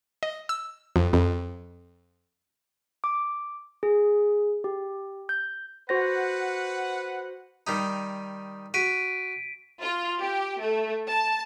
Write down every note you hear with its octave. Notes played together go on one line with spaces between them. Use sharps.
D#5
E6
F2
F2
D6
G#4
G4
G6
F#4 B4 C5 F#5 A#6
D#3 G3 D#4
F#4 B6 D7 D#7
F4
G4
A3
A5